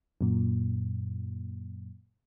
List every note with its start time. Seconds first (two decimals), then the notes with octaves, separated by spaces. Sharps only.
0.21 F#2 A#2